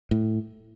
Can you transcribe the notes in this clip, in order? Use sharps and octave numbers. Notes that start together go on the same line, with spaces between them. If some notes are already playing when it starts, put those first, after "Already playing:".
A2